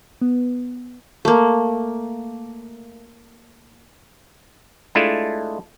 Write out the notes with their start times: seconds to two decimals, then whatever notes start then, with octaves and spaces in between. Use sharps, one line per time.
0.21 B3
1.25 A3 A#3
4.95 G#3 A3 D4 E4 F4 A4